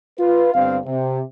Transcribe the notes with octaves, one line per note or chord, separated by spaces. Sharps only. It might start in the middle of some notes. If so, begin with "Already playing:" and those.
F4 B4
G1 G2 C4 F5
C3